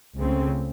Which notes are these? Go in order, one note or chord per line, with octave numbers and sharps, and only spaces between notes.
C#2 C#3 A3 C4